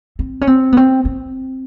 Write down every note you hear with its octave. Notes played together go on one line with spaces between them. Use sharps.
C4
C#4
C4
B3
C4
C4